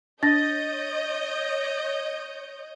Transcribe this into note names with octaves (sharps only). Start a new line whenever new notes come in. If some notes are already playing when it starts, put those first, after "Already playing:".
D4 C#5 D#5 G6 A6 A#6